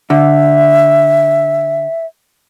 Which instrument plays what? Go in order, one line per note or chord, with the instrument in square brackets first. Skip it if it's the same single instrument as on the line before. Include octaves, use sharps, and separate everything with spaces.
[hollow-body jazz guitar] D3 [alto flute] E5